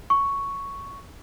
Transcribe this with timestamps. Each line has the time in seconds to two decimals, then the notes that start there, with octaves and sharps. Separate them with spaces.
0.10 C#6